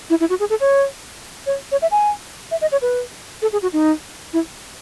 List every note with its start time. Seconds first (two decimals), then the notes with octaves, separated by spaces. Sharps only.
0.10 E4
0.20 E4
0.30 F#4
0.40 G#4
0.50 A4
0.60 C#5
1.47 C#5
1.72 C#5
1.82 E5
1.92 G#5
2.51 E5
2.61 D#5
2.72 C#5
2.82 B4
3.42 A4
3.53 G#4
3.62 F#4
3.73 D#4
4.33 E4